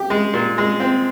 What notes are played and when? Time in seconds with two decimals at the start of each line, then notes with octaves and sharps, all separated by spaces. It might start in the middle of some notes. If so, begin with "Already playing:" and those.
Already playing: G4
0.10 G#3
0.34 A#2
0.58 G#3
0.80 C4